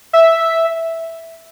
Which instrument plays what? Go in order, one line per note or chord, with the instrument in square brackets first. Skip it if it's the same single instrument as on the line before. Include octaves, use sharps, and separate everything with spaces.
[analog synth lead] E5